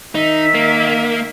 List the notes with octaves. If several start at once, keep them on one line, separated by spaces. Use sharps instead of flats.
D#3 D#4 E5
A#3